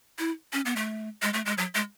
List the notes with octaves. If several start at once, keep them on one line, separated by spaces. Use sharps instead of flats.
E4
C#4
B3
A3
G#3
A3
G#3
F#3
G#3